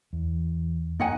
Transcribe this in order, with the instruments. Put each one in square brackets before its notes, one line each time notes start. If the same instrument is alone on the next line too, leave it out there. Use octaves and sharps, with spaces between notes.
[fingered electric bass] E2
[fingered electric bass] F2 A#3 B3 [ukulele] D#4 F#5 G#5